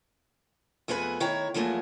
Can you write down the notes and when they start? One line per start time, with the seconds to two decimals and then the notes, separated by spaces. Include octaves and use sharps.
0.88 F2 A3 B3 G#4 B4 G#5
1.20 D#3 E4 C#5 G5 A#5
1.54 E2 F3 F#3 A3 A#3 G#4